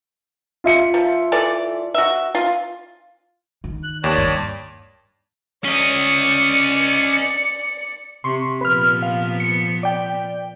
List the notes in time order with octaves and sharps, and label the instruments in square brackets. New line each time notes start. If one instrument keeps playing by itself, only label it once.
[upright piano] F4 E5 C#7
[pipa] F3
E3 A4 D5
F#4 E5
F4
[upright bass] D#3
[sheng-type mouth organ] F#6
[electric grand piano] D#2 [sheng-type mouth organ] C#5 D5 A5
[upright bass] G2
[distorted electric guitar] C#4 D#5 [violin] D5 C#7
[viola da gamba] C3 [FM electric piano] C6 C#6
[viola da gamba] A#2 F3 B3 [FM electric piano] B4 F6
[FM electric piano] F5
C#7
D5 G5